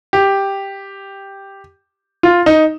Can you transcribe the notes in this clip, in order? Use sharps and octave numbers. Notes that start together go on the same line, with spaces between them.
G4
F4
D#4